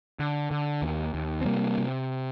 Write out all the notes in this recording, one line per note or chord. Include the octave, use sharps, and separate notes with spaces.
D3
D3
D#2
D#2
C4
C3 G3 A#3
C3